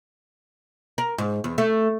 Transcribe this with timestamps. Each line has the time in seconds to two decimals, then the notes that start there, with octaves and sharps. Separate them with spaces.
0.98 A#4
1.18 G#2
1.44 E2
1.58 A3